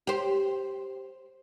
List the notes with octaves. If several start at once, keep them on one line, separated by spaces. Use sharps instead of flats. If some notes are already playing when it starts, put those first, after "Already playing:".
G4 C5